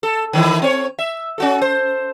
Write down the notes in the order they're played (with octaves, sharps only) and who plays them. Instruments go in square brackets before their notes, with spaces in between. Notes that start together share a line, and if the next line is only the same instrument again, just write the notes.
[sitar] A4
D#3 E3 E4
C4 C#5
E5
C#4 F#4 A4
C5